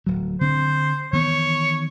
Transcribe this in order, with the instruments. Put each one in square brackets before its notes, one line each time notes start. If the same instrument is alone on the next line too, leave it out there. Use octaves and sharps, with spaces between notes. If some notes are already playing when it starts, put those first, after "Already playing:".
[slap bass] D1 F#3
[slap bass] D3 C4 [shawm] C5
[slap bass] D#3 E3 B3 [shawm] C#5